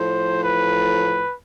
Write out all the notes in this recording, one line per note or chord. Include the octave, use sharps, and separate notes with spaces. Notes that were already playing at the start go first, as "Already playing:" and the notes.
Already playing: A2 F3 C5
B4